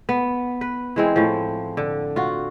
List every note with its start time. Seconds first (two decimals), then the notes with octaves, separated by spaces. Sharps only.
0.09 B3
0.61 B4
0.96 E3 G#3 C4
1.16 A2 F3
1.77 D3
2.16 F4 F#4